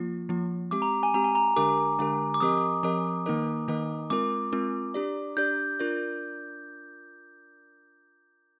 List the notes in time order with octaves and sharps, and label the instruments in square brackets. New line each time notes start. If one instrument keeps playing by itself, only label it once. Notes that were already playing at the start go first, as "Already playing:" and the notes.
Already playing: [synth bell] F3 A#3 F4
F3 A#3 F4
[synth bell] G#3 C4 G4 [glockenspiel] D6
[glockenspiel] A#5
G#5
[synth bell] G#3 C4 G4 [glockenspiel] A#5
[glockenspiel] G#5
A#5
[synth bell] D3 G#3 D4 G4 A#4 [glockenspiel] D6
[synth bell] D3 G#3 D4 G4 A#4
[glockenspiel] D6
[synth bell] F3 C4 G4 A#4 D#5 [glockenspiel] D#6
[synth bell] F3 C4 G4 A#4 D#5
D#3 A#3 D#4 A#4 D#5
D#3 A#3 D#4 A#4 D#5
[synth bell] G#3 C4 F4 A#4 [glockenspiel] D6
[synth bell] G#3 C4 F4 A#4
D4 G4 D5
[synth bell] D4 G4 D5 [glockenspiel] G6
[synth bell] D4 F4 A#4 D5